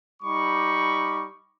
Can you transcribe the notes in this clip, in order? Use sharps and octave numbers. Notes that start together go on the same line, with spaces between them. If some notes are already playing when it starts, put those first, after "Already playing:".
G3 D#4 B5 C#6 D6